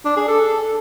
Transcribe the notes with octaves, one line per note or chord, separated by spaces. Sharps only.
D4
G#4
A4